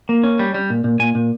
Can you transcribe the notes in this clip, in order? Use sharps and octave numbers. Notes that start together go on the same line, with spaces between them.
A#3
C#4
G3
G3
A#2
A#2
A#2 G#5
A#2